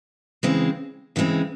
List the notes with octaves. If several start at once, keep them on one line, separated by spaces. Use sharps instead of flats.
C#3 E3 G#3 C4
C#3 E3 G#3 C4